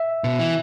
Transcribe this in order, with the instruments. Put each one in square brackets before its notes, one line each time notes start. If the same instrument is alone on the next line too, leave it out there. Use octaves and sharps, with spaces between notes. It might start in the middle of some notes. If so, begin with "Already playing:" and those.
Already playing: [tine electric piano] E5
[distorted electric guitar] B2
E3